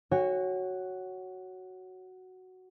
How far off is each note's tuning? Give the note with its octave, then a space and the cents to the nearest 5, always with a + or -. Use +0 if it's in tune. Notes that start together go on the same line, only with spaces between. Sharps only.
F#4 +5 C#5 +0 G#5 -45